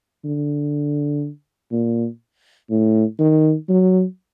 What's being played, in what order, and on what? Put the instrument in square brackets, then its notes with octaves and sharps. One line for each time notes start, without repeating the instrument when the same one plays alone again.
[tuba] D3
A#2
A2
D#3
F#3